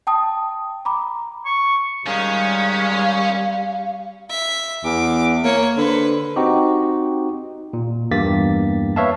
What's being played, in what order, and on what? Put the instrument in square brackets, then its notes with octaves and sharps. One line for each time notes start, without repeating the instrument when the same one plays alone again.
[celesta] G5 A5 D#6
A#5 B5 D6
[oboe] C#6
[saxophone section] D#3 G#3 [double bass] G3 [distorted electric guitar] C#4 [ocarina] F5
[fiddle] E5
[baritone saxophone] E2 [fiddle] D6
[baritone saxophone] A#3 [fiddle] C#5
[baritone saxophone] D3 [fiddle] B4 C5
[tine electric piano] C4 D#4 F#4 G4
A#2
E2 G2 A#3 G4 A6 B6
B4 C#5 E5 F5 A5